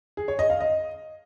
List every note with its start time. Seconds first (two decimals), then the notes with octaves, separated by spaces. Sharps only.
0.17 G#4
0.28 C#5
0.39 D#5
0.50 F5
0.60 D#5